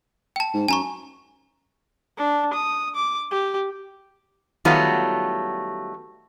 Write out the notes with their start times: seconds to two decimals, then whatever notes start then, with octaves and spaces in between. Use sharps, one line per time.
0.36 G5 A5
0.54 G#2
0.68 F#2 G#5 A#5 C#6
2.18 D4
2.53 D#6
2.95 D6
3.31 G4
4.65 D#3 F#3 G3 A3 B3 F4